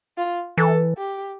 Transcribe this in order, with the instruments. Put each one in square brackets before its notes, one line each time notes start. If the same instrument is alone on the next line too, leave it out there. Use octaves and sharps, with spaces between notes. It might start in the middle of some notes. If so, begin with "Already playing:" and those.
[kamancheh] F4
[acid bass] E3 [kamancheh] A4
[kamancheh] G4